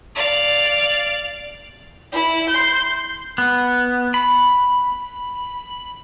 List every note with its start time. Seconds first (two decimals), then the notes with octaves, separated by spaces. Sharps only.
0.16 D5 F5
2.13 E4
2.50 C6 G6
3.38 B3
4.14 B5